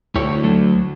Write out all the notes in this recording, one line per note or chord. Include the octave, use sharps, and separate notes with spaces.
D2 E4 G4 C#5
F#3 A3